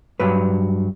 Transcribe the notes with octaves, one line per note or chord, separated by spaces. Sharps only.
G2 F#3 B4